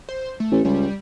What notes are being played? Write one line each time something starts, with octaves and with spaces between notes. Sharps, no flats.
C5
A3
A1
C#2 G3